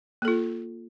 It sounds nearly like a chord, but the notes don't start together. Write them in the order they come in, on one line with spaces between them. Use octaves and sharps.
A#3 A4 F4